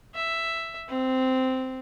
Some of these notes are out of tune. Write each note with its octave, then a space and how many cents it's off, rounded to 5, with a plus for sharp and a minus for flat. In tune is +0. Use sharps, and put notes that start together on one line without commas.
E5 +5
C4 -10